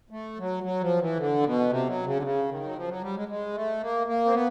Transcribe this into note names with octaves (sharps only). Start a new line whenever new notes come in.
A3
F#3
F#3
F3
E3
D3
B2
C3
F#3
C#3
D3
C#3
D#3
F#3
F3
F#3
G3
G#3
G#3
A3
A#3
A#3
C4
B3